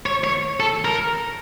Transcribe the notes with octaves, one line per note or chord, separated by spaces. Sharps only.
C#5
C#5
A4
A#4